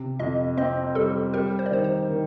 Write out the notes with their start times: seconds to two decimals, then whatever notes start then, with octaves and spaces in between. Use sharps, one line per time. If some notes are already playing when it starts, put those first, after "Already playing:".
Already playing: C3
0.19 F2 D#5
0.57 C4 D#5
0.95 G3 A4
1.34 G3 A#4
1.59 C5
1.66 D5
1.71 D#3 C5
1.84 C5
2.09 D#3